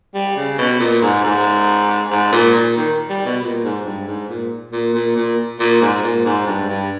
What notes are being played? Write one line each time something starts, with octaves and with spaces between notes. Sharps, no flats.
G3
C#3
B2
A#2
G#2
G#2
G#2
A#2
A#2
D#3
G3
B2
A#2
G#2
G2
G#2
A#2
A#2
A#2
A#2
A#2
G#2
A#2
G#2
G2
G2